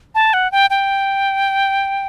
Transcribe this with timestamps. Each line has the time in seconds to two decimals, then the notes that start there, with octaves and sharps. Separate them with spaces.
0.15 A5
0.33 F#5
0.52 G5
0.70 G5